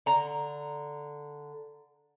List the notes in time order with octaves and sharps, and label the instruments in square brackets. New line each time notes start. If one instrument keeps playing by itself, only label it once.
[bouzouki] D3 A#5